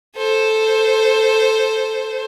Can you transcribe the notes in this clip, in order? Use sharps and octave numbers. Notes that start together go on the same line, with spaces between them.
A4 C5